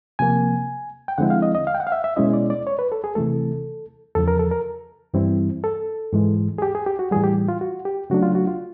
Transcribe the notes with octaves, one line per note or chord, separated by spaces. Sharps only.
C3 F3 A#3 G#5
G5
D3 F3 G#3 C4 E4 F#5
F5
D#5
D#5
F5
G5
F#5
F5
E5
E5
B2 G#3 C#4 E4 D#5
D5
D5
C#5
B4
A4
G#4
C3 E3 A3 A4
E2 C#3 F3 A4
A#4
A4
A#4
G2 E3 G3 C4 E4
A4
G#2 E3 G#3
G#4
G4
G#4
G4
F#4
A2 E3 G3 G#4
G4
F4
F#4
G4
C#3 F#3 A3 D4 F#4
F4
F#4
F4